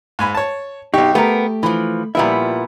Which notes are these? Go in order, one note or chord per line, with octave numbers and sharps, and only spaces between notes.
G#2 G#5 B5
C#5 A5
B1 D#4 G4 C#6
A3 B3 G4 A#4
E3 F3 B5
A#2 F3 G3 B3 E4 E5